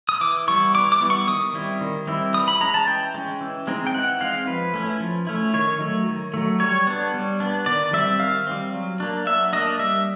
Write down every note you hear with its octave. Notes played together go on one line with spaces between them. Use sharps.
D#6
E3 D6
G3 B3 E4 C#6
E3 D6
D6
G3 B3 E4
C#6
D#3 D#6
G3 C4 E4
D#3
G3 C4 E4
E3 D#6
B5
G#3 C#4 A#5
A5
E3 G5
G#3 C#4
E3
G#3 C4 D#4
G5
E3 F#5
G#3 C4 D#4 F5
F3 B4
A3 C#4 E4
F3
A3 C#4 E4
D#3 C#5
F#3 A3
D#3
F#3 A3
G3 C#5
B3 D4
G3
B3 D4
D#3 D5
G3 C4 E5
D#3 F5
G3 C4
F#3
A#3 D4
F#3 E5
A#3 D4 D#5
G3 E5